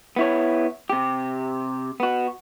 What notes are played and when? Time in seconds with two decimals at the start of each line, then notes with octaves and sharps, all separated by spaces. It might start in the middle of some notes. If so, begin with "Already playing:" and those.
0.16 B3 E4 C#5
0.90 C3 G4
2.00 B3 F#4